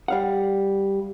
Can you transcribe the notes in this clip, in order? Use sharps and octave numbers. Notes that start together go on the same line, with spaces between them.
G3 F5 F#5